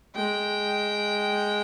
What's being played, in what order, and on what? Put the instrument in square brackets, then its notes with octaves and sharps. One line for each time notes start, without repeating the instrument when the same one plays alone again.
[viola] G#3 [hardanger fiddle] G5